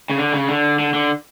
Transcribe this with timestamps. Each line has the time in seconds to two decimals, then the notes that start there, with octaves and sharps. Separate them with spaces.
0.10 C#3
0.18 D3
0.33 C#3
0.48 D3
0.79 D3
0.94 D3